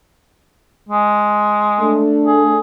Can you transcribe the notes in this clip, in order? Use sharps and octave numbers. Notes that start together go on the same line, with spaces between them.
G#3
A3 D4
G#4